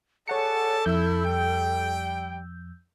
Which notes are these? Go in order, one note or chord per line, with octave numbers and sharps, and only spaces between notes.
G#4 A4 C#5 D5 F#5 A5 C#7
F2 E4 E6 G6
G3 G5